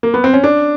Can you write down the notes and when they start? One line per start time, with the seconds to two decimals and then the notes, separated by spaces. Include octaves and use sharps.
0.03 A#3
0.14 B3
0.24 C4
0.34 C#4
0.44 D4